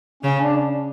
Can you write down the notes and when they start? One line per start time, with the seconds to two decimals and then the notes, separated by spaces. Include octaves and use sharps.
0.23 C#3 C#4
0.39 D4